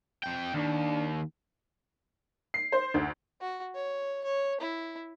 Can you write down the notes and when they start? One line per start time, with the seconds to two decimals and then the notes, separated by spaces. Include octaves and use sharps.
0.23 F2 G5
0.54 D#2 D4
2.54 C7
2.72 C5
2.94 D2
3.41 F#4
3.75 C#5
4.25 C#5
4.61 E4